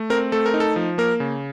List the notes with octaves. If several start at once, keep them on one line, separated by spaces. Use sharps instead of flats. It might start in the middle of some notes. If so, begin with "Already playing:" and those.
Already playing: A3
C4 A#4
A3 A4
A#4
D#4
A4
F3
A#3 A#4
C#3